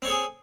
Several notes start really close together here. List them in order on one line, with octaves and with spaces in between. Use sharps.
C4 C#5 A4 G#4